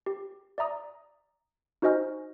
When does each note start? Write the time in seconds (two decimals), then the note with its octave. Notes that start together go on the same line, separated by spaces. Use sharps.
0.06 G4
0.58 D5 E5 A#5 D#6
1.82 D#4 F#4 C5 D#5 G#5 F6